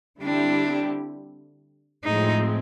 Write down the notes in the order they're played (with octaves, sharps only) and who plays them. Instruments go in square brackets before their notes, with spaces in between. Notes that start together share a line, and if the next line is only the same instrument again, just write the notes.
[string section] D3 G3 C4 E4 G4 [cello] D4
[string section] A2 F3 G#3 C4 [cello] D#4